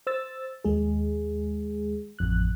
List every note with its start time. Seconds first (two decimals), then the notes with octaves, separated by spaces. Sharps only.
0.07 C5 E6 A6
0.65 D#2 G#3 G#4
2.19 A1 F2 F#6